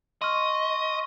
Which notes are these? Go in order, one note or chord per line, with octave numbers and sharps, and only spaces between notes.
D#5 C6 C#6 F6